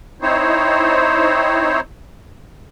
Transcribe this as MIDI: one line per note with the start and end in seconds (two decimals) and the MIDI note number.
0.22 1.80 60
0.22 1.80 63
0.22 1.80 64
0.22 1.80 72
0.22 1.80 73